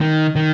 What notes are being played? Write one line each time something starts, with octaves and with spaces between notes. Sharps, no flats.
D#3
D#3